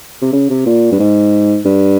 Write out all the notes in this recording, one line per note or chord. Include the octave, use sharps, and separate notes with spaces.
C3
C#3
C3
A#2
G2
G#2
G2